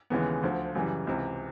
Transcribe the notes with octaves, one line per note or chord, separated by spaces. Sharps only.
D#2 C#3 E3 G#3 B3
D2 D3 F3
F#2 C#3 E3 G3
C#2 C3 E3